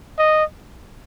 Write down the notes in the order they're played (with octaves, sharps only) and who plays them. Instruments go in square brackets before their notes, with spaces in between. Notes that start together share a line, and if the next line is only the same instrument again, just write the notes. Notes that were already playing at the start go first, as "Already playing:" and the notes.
[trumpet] D#5